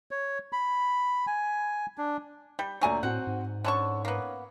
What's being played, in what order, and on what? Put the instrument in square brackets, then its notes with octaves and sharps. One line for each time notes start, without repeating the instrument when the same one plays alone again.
[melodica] C#5
B5
G#5
D4
[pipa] G3 [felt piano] G6
[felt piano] D2 A#2 D5 [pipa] F#3 G#5 A#5
[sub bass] A2 [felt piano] C4 F#4 [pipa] F#5
[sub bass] G#2
[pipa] D3 A5 C#6 [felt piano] C#4
[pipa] A#3 B3